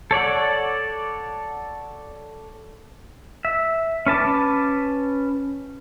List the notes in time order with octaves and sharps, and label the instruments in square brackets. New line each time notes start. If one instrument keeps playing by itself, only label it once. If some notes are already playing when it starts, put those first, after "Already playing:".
[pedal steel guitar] A4 C#5 D5 F#5
E5
C#4 B4 A5 D6